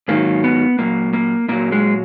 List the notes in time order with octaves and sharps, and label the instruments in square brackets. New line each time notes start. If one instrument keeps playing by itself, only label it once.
[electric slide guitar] G#2 D#3 F#3 A#3
B3
A#2 F#3 A#3
A#3
A#2 F#3 A#3
G#3